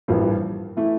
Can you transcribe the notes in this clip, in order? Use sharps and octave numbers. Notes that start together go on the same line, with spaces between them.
A1 G2 F3 A#3
E3 A3 E4